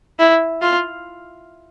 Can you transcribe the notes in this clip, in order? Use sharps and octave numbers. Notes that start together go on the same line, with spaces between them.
E4
F4